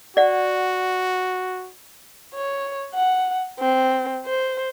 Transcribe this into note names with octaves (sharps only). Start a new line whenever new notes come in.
F#4 D5 F#5
C#5
F#5
C4
C5